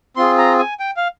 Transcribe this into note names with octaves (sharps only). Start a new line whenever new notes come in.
C4 F4 G#4 C6
A#5
G#5
G5
F5